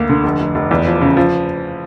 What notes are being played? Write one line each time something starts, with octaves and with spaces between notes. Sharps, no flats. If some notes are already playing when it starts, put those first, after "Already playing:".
Already playing: D2 A#3
D3
F1
F1
F1
E2
F3
C#3
F3